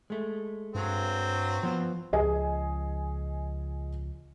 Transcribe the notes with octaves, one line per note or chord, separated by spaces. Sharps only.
G#3 A3
G2 F#3 C4
F3 B3 C5
C#2 F3 G#4 D#5 G#5